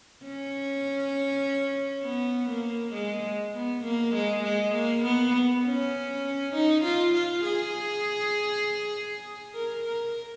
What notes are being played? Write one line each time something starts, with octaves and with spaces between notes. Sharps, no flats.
C#4
B3
A#3
G#3
B3
A#3
G#3
G#3
A#3
B3
C#4
D#4
F4
F4
G#4
A#4
A#4